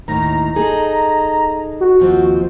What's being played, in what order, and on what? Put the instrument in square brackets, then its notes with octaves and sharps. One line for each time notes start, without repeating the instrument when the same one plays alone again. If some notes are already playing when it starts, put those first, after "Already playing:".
[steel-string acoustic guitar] D#2 A2 D#3 [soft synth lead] A#5
[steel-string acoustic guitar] D#4 G#4 A4
[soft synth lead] F#4
[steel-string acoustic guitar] D#2 F3 C4